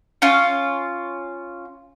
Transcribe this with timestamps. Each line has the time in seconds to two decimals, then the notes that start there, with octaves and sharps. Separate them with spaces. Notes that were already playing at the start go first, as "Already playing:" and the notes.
0.22 C#4 F4